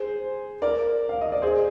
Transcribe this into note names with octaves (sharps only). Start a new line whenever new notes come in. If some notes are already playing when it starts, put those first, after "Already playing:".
Already playing: G#4 C5
A#4 D5
F5
D#5
D5
G#4 C5